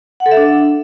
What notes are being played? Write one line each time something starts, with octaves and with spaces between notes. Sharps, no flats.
F#5
A4
E5
D4